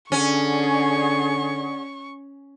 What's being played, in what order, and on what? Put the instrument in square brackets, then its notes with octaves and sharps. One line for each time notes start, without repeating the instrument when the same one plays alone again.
[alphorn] D3 [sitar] C#4 [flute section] G#4 D5 F#5 [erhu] C#6